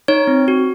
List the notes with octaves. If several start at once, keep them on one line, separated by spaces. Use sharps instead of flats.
D#4 C#5
C4
F#4